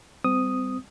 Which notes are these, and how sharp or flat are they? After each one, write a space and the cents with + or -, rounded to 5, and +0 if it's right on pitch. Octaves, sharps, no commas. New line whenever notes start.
G3 +10 C4 -30 D#6 +0